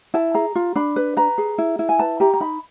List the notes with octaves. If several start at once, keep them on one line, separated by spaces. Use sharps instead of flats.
E4 A5
G#4 A#5
F4
D4 B5
B4
B4 A#5
G#4
E4
E4
G#5
B4 A5
G4 A#5
A#5
D#4 B5